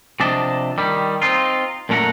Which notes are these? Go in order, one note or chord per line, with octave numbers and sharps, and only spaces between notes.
C3 F3 D4 D5 D#5 A5
D#3 G3
C4 D#4 F4
F#2 A#2 A3 A#4 F#5 A#5